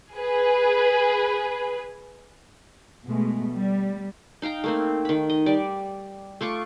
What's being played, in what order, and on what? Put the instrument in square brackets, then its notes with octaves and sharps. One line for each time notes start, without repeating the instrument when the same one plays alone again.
[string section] G#4 B4
[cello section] B2 G#3 A3
G3
[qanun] D#4 F5 G5 A#5
A3 A#3 C4
D#3 B5
D#5
G3 D5
A3 F4 C#6 D6